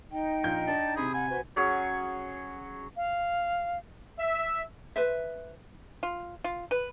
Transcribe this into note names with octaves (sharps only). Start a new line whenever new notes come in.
D#4 G5
A#1 F4 G6
D4 A5
C3 G#4 B5
F#5 G#5
F#4 B4 C5
F#3 C#4 G#4 C#5
F5
E5
B4 C5 E5
F4
F4
B4